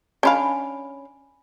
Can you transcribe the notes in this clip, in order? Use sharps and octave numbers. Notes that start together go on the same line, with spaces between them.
C#4 D4 F5 G#5 B5